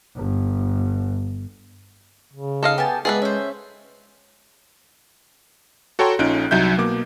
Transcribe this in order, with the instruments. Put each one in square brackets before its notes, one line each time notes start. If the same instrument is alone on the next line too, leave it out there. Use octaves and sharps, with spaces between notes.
[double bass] G1
[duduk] C#3
[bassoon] D#4 [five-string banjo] A4 D#5 F5
[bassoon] B3 [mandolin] G4 G#5 A5
[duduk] G#3 [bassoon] B3 [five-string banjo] G#4 A4 B4 [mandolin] D5 E5
[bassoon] C#4 [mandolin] C5 E5
[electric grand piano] F#4 A4 C#5 G5 A#5 C6
A#1 C#4 D#4 F4 F#6 D7
C2 F#3 D#4 E5 G6
B2 A#3 D6